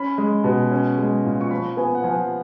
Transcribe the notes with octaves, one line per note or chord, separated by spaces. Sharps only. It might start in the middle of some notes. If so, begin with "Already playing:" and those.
Already playing: C#4 B5
G#3
B2
C#4
G#3
A#2
C#6
F3 B5
B3 G#5
F#5
F3 G#5